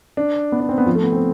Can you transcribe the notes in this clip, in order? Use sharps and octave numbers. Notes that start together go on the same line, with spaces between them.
D4
B3
D4
C4
B3
F3
A3
B3
C4